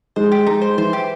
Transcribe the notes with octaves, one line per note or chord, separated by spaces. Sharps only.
G#3 C5
G4
G#3 D#4
C5
E3 C5
G4